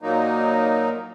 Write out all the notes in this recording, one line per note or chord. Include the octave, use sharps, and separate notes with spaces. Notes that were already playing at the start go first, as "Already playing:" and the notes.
A#2 F#3 A#3 D#4